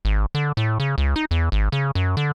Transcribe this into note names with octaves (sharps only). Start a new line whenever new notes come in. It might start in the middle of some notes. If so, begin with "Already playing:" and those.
G#1
D3
A2
C#3
C#2
D#4
E2
G#1
C#3
F#2
D3